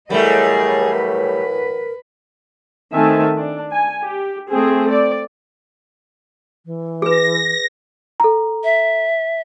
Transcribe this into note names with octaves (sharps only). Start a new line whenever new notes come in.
A2 E3 F#3 G3 A3 G#4 A#4 D#5
B4
D#3 A3 C4 E5 G#5 A5
D4
G#5
G4
A3 C4 G#4
D5
E3
G#4 B4 A#6
A4 A#5
E5